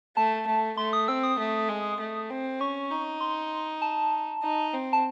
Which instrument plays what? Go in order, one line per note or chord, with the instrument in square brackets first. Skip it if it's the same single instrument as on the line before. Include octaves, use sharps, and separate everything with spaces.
[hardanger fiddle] A3 [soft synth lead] A5
[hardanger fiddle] A3
[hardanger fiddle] A3 [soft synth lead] C6
[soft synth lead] D#6
[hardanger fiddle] C4 [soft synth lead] E6
[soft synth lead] D#6
[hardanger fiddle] A3
G#3
A3
C4
[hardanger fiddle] C#4 [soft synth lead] C#6
[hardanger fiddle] D#4
[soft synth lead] C6
A5
[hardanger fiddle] D#4
C4
[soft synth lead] A5